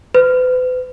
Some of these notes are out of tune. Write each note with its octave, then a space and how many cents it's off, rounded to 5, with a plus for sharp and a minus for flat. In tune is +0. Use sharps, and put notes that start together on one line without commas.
B4 +40